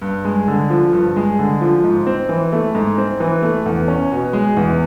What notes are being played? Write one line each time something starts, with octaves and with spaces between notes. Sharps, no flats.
G2
G#3
D3
F3
G2
G#3
D3
F3
G#2
C4
E3
A3
G#2
C4
E3
A3
E2
C#4
B2
G#3
E2